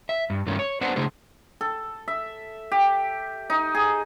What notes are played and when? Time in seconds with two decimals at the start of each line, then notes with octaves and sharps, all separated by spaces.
0.09 E5
0.30 G2
0.46 G2 D#3 A3 C#4
0.59 C#5
0.81 B3 D4 B4 C5 F#5
0.96 C#3 A3 D4 G#4 C5
1.61 A4
2.08 E5
2.72 G4
3.50 D#4
3.75 G#4